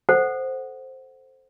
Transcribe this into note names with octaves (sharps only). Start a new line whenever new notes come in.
A4 C5 F#5